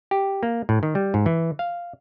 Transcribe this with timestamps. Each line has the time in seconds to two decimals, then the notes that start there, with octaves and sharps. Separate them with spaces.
0.11 G4
0.43 A#3
0.69 A2
0.83 D#3
0.95 G3
1.14 G#2
1.26 E3
1.59 F5